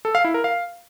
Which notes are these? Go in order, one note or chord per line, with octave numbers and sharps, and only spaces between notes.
A4
F5
E4
A#4
F5